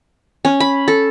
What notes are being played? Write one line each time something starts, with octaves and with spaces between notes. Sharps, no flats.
C#4
B5
A4